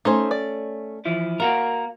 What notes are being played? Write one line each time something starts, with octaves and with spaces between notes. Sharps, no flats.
A3 C#4 D#4 C5 G#5
D5
E3 F3 E4
A#3 F#4 A#4 F5